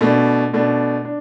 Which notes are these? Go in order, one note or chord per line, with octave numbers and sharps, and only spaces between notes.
B2 A3 D4
B2 A3 D4
D4